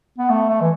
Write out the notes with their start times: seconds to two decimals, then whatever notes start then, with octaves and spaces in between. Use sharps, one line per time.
0.18 B3
0.30 A3
0.49 A3
0.61 E3